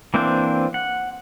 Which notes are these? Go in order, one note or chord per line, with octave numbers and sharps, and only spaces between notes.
E3 A#3 C4 D4 C5
F#5